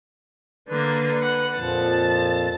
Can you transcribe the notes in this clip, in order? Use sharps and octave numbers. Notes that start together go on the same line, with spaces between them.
D3 A#3 B4
F#5
F2 A#2 F3 A5